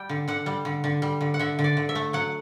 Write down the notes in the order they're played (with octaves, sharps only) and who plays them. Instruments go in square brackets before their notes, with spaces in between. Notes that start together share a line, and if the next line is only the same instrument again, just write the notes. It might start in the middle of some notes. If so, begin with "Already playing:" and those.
Already playing: [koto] G3 G5
D3
D3 F#5
G3
D3
D3
G3
D3
F#5
D3 E5
D3
D5
D3
E5
A3
F#3 F#5